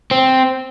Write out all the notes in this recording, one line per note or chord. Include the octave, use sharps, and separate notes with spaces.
C4